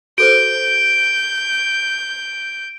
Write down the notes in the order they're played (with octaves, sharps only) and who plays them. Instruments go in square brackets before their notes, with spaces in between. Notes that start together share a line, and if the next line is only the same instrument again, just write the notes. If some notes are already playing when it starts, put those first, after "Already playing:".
[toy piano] F#4 A4 C5 [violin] G6 [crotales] D7